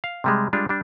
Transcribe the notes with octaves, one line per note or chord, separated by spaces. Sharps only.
F5
C3 G3 G#3
G3 G#3 D4 F4
G3 D4